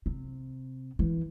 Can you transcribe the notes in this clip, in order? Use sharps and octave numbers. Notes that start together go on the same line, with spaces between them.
C3
E3